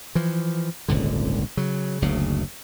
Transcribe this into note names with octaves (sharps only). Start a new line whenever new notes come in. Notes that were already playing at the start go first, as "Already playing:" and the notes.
E3 F3
D#1 G#1 C#2 D3
C#3 F#3
F#1 D2 C#3